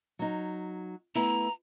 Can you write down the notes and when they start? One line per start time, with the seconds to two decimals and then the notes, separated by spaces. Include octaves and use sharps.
0.19 F#3 D#4
1.15 A3 B3 E4 A#5